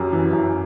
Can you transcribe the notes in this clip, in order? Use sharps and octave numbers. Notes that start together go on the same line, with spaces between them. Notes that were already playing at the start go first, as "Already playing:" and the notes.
Already playing: F#2 G4
E3
F#2